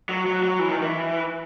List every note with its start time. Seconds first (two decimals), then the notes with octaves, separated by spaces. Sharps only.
0.09 F#3
0.26 F#3
0.43 F#3
0.59 E3
0.69 D#3
0.81 E3